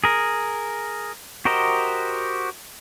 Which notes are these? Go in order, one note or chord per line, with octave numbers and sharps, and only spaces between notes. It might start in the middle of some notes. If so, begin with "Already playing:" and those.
G#4 A#4
F#4 G4 A#4 C5 D#5